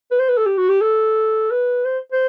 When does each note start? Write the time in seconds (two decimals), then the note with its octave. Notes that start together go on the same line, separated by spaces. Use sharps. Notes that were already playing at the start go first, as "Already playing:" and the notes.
0.11 B4
0.19 C5
0.29 B4
0.37 A4
0.46 G4
0.58 F#4
0.69 G4
0.81 A4
1.51 B4
1.85 C5
2.12 C5